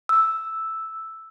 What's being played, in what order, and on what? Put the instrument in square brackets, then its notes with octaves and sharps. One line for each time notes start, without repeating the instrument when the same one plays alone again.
[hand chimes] E6